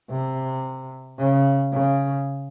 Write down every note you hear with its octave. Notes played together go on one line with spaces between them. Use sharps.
C3
C#3
C#3